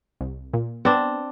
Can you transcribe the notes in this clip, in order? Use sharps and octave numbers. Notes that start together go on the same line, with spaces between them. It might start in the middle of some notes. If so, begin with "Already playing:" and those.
C2
A#2
B3 C4 D4